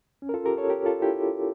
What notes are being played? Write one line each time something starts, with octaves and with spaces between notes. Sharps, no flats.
C#4
A#4
F4 A4
G4 A#4
A4 C#5
G4 A#4
F4 A4
E4 G4